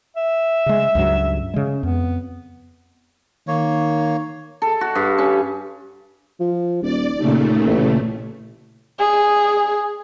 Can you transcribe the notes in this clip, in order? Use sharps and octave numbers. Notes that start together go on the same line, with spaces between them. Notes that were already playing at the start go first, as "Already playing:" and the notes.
E5
C#3 G#3
C#2 G2 F#3
C#3 G#3
F2 B3
D#3 A#3 C#5
A4
F#4
G2
C#4
F3
D#1 D5
D#2 A#2 C#3 A3
A1
G#4